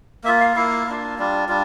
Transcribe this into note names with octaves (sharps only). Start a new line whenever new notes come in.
A#3 F4 E5
F5
A#3 E4 F5
A#3 D4 F4
G3 D4 F4
G3 D4 F4